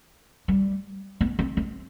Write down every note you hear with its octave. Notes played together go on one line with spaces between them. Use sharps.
G3
B3
C4
C4